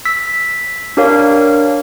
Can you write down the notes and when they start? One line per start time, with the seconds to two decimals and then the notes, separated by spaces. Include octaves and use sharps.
0.05 E6 B6
0.97 D4 G4 A#4 C#5 F5